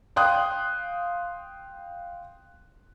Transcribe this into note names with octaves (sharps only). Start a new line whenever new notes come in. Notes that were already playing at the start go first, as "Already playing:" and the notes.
F5 G5 C6 D#6 F#6